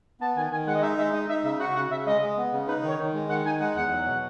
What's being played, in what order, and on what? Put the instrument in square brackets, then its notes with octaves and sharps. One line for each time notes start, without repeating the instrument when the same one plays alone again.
[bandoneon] B3 [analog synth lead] A5
[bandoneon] D#3 [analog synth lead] G#5
[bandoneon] D#3 [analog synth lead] G#5
[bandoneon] G#3 [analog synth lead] F#5
[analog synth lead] D#5
[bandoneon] D#4 [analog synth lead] E5
[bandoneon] G#3 [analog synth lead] E5
[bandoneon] D#4 [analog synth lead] D#5
[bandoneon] D#4 [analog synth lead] E5
[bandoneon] C#3 [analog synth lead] E5
[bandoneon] F#4 [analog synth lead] F#5
[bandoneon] C#3 [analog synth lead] F#5
[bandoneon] C#3 [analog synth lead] E5
[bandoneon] G#3 [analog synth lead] D#5
[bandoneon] G#3
B3
C#3
[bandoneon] D#4 [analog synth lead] B4
[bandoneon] D#3 [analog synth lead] C#5
[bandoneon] D#3
G#3
[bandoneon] D#3 [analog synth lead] F#5
[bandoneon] D#4 [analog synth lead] G#5
[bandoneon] G#3 [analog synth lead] F#5
[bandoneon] E2 [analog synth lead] F#5
[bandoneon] F#3
B2